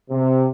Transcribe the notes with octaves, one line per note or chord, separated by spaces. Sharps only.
C3